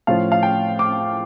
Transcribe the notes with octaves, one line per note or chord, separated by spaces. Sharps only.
A2 F3 C#4 F4 F5
F5
G5
D6